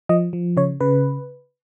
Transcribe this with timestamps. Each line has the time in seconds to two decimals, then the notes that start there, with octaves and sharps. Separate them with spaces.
0.09 F3 D#5
0.33 F3
0.57 C#3 C#5
0.81 C#3 B4